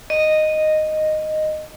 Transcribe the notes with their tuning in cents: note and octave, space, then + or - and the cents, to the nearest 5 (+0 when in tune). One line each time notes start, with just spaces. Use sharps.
D#5 -5